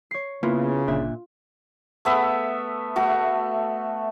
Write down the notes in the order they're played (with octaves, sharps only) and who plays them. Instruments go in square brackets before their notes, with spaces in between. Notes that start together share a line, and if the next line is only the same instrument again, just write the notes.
[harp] C#5 C7
[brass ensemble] C#3 [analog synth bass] A#3 [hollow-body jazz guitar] B3 E4 [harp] F4
[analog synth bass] G1 [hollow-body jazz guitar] A#2 D4 E5
[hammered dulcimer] A3 B3 E5
A3 F#4